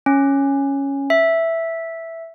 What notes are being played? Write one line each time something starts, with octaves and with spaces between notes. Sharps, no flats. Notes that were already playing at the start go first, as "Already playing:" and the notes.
C#4
E5